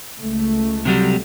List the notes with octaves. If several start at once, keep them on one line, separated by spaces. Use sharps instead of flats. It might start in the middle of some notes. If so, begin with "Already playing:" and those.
C#2 A3
C3 F#3 G3